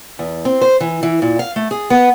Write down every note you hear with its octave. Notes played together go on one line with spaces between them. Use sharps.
E2
C4
C5
E3
E3
A#2
F5
A3
G#4
B3